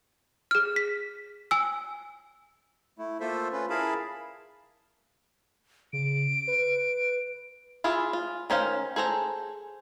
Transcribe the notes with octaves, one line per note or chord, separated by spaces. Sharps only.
G#4 F6
B6
G#5 E6
A3 E4
A3 A#3 F4 A4 C5 E5
C#4 F4 B4
E4 G#4 A#4 F5 A5 B5
C#3 D7
B4
E4 F4 G#4
F4
D#3 C#4 C5 F5
G#4 A4 C5 A#5